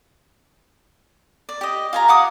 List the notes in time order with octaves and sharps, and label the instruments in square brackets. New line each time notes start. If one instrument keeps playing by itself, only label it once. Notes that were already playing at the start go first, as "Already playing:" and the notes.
[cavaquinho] D5
G4 D#5
F4 G#5 A#5
F5 F#5 D6 D#6